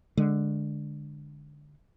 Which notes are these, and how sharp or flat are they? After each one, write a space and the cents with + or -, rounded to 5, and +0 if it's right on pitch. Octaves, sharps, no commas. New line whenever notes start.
D3 +0 G#3 +0